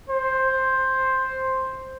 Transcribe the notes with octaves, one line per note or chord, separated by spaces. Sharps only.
C5